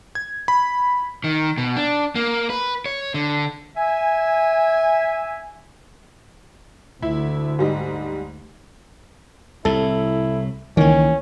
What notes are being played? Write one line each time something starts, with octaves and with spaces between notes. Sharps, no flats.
G#6
B5
D#3
B2
D4
A#3
B4
C#5
D3
E5 G#5
D2 E4
G#2 G3 D#5
C2 A2 E4 A4
C#2 D#3 E3 A#3 C#4